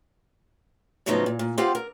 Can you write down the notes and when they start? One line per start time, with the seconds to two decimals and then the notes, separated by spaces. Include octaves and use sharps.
1.06 A2 C#3 F3 F#3 B3 D#4
1.26 A#2
1.39 A#2
1.58 C4 F4 G4 C5 F5 F#5
1.75 A#4